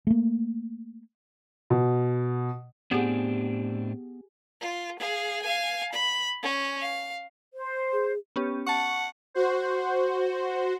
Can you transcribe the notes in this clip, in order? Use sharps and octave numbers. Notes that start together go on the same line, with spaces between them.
A3 A#3
B2
A2 B3 C4 D4 G4 G#4
F4
G#4 F5
F5 G#5
B5
C#4
F5
C5
G#4
B3 C#4 G4
F#5 A5 C#6
F#4 C5